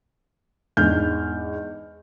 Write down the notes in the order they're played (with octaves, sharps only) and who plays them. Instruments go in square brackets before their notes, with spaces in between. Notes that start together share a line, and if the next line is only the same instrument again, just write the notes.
[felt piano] E2 G#2 D4 F6 G6